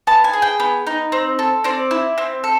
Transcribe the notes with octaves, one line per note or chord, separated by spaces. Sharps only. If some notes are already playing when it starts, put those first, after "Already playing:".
B3 A5
G#5
G#4
G5
B3
D#4
C4
A4
C4 D5
E4
C4
A4